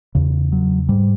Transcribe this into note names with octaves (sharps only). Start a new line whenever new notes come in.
E2 C#3
F#3
G#2 G3